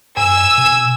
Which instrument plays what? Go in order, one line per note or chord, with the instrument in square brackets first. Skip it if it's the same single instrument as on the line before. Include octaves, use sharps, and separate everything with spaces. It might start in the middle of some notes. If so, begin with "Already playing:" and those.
[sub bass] F#2 [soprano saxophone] G#5 [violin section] E6
[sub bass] B2